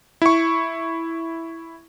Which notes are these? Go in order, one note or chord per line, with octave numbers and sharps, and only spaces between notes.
E4 C#6